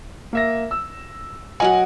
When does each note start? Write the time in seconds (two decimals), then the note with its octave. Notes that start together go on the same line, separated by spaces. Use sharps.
0.33 A#3 E5 A#6
0.71 E6
1.60 F#3 F#4 A#4 D#5 F#5 G#5